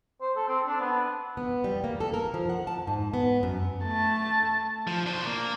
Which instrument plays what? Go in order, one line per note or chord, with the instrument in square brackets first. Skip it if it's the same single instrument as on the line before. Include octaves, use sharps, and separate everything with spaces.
[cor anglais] C5
A4
C4
D4
B3
[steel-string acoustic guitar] B3
G3
A#3
A4
A#4
F3
F#5
A5
G#2
B3
F#2
[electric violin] A3 A5
[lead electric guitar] F3
D4 C5
A#3